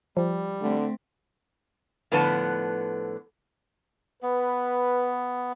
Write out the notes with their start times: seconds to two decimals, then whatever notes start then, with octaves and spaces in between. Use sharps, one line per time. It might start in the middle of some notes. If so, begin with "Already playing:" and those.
0.17 F3 G3
0.61 D3 A3 C4
2.12 A2 D3 F3 B3 B4 A5
4.23 B3 B4